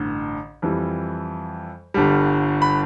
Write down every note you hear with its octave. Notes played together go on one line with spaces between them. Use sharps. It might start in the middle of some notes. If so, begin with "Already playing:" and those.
Already playing: A1 G2 D3
F2 E3 G3
G1 G2 D3 G3
B5